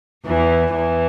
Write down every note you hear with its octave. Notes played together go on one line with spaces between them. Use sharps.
E2 E3
E2 E3